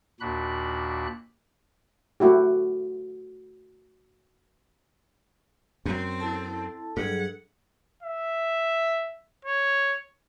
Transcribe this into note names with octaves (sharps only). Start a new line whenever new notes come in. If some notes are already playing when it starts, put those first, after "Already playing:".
D#2 A#2 D4 F#4 B5 F#6
A3 E4 F#4 G4
F#2 C4
E4 A4 A5
G2 F#3 G#4 A4 F#5
E5
C#5